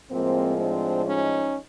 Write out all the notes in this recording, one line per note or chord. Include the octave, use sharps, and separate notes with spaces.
A2 F3 G#3 A#3 C4
C4 D4
C#4 D#4